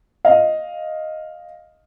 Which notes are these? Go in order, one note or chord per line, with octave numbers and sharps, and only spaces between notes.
D#5 F5